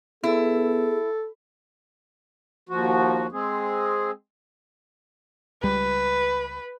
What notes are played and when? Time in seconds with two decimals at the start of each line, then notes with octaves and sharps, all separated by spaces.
0.24 B3 E4 G#4 A4
2.69 D#2 F3 F#4
3.32 G#3 C4 G#4
5.63 C#2 G3 B4